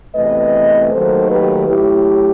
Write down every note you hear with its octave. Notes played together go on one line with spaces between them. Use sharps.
E2 C3 E3 A3 B4 D#5
D#2 D#3 F#3 A3 A4 C5
G4 B4
A2 F#3 A3 E4 G4